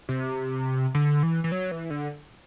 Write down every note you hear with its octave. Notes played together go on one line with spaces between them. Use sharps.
C3
D3
E3
E3
F#3
E3
D3